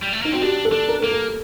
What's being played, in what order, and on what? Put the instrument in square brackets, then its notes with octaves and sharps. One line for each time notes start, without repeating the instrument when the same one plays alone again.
[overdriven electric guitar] G3
A3
[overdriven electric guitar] A#3 [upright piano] D#4
[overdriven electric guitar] C4 [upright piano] F#4
[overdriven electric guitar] D4 [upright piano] G4
[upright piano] A4
[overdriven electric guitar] D4
[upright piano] A#4
[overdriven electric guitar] A#3 [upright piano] A4
[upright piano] A#4